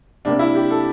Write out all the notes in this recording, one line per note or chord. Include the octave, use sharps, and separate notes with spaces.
C3 G3 A#3 D4
E4
G4
A4